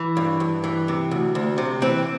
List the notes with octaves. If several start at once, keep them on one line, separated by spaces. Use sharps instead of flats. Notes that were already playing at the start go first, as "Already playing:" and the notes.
Already playing: E3
G2
G2
E3
C3
D2
D2
C3
E3 C4